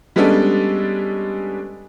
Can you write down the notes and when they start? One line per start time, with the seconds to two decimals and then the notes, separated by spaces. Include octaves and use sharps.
0.16 G3 G#3 B3 C#4 D4 A4